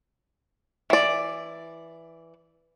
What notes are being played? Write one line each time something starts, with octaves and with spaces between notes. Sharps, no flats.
E3 D5